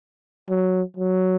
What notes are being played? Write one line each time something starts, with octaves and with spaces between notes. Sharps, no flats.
F#3
F#3